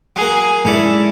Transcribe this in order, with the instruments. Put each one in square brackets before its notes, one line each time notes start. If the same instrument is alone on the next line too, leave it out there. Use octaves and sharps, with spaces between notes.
[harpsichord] F#3 A#3 [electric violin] G#4
[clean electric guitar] G#2 G#3 D5 [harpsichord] C#4 A4 [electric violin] E4